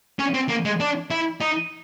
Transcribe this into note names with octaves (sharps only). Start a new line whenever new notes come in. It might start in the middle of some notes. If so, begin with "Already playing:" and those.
C#4
C4
A#3
G#3
D4
E4
D#4